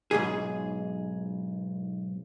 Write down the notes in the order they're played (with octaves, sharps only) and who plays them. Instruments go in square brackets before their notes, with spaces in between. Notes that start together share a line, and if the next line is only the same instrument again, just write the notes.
[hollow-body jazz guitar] B1 E2 G#2 G#4